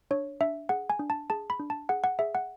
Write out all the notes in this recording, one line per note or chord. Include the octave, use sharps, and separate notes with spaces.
D4 C#5
D4 E5
G#4 F#5
G#5
D4
A5
G#4 A5
B5
D4
A5
G#4 F#5
F#5
G#4 E5
F#5